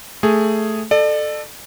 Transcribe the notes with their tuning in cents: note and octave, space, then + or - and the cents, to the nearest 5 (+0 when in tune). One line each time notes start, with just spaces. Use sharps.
A3 +0 G#4 +0
A4 +0 D5 +40